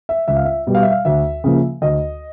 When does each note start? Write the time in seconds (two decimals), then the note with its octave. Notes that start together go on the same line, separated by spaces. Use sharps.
0.09 E5
0.28 C#2 E5
0.36 F5
0.45 E5
0.67 B2 G3
0.75 F5
0.83 E5
0.91 F5
1.05 D2 E5
1.44 C#3 F3 A#3
1.82 D2 D#5